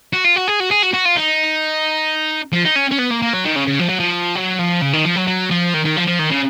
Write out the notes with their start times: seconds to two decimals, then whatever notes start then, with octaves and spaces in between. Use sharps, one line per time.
0.13 F#4
0.25 F4
0.36 F#4
0.48 G#4
0.60 F#4
0.71 G#4
0.82 F#4
0.94 F#4
1.05 F4
1.16 D#4
2.53 F3
2.65 D#4
2.76 C#4
2.92 C#4
2.99 B3
3.11 A#3
3.22 A#3
3.33 F#3
3.45 D#3
3.56 C#3
3.67 C#3
3.79 F3
3.89 F#3
4.00 F3
4.36 F#3
4.59 F3
4.82 C#3
4.93 D#3
5.05 F3
5.16 F#3
5.27 F#3
5.50 F3
5.74 D#3
5.85 D#3
5.96 F3
6.07 F3
6.19 D#3
6.31 C#3